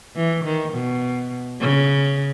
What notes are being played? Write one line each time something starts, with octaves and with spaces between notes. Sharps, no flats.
E3
D#3
B2
C#3